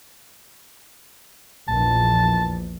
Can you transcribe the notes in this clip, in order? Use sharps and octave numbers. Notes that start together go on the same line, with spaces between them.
A#1 E2 A5